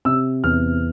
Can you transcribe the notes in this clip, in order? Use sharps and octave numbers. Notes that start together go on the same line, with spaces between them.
C3 E6
E2 F6